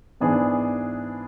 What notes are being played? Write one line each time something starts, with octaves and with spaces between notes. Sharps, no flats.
G#2 E3 B3 D4 G#4